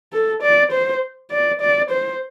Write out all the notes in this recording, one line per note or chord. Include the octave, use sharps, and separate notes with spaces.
A4
D5
C5
D5
D5
C5